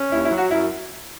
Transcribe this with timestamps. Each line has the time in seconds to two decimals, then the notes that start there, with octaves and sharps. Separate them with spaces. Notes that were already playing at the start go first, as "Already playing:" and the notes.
Already playing: C#4
0.12 D#2 E4
0.25 E4
0.31 F#3
0.38 F#4
0.51 F#2 E4